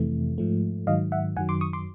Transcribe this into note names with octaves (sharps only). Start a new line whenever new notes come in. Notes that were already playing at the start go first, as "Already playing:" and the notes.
Already playing: F2 C3 E3 A3
G#2 F3 A3
G#2 D#3 F#3 D#5 F5
E5 F#5
F#2 D#3 F#3 F#5 G#5
C6 D6
C#6 D#6
C6 D6